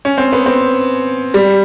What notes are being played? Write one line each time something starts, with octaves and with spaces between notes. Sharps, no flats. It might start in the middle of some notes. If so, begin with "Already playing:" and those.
C#4
C4
B3
C4
G3